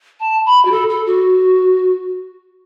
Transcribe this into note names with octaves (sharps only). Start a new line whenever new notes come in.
A5
B5
F#4
A4
A4
F#4